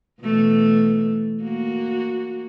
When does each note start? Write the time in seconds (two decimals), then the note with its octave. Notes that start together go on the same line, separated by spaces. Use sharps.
0.22 B2 E3 A3
1.42 A#3 F#4